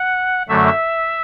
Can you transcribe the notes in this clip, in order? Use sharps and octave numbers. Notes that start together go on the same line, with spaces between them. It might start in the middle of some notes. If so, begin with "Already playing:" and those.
Already playing: F#5
F#2 D3 F#3 A3 E5